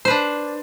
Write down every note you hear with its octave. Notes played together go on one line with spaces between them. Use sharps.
D4 B4 C5